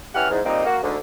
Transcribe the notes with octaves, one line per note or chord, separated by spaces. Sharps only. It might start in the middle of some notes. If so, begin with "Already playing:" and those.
E3 C#4 G4 F#5 F6
E2 G#2
A#2 G3 A#3 C4 D#4
A#3 F#4
D2 G#2 D3